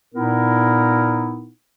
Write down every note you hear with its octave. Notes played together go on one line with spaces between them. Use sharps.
A#2 B3 D#4 E4 A#4